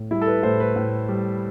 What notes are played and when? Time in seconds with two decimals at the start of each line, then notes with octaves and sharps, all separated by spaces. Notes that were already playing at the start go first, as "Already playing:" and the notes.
Already playing: A2
0.11 G3 E4
0.21 A4
0.27 B4
0.43 A2 C5
0.60 B4
0.76 A2
1.09 G3